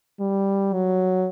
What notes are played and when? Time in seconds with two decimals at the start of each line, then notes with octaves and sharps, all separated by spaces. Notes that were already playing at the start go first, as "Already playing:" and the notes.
0.20 G3
0.73 F#3